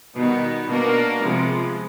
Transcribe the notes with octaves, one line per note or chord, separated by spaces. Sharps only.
B2 D#3 G3 B3 D#4
B2 A#3 D4 F#4 A#4
C3 F3 G#3 B3